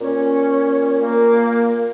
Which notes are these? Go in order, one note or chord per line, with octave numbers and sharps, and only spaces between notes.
A#2 C#4
A#3